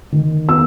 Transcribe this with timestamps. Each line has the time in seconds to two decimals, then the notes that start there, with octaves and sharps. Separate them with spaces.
0.12 D#3
0.49 B3 E6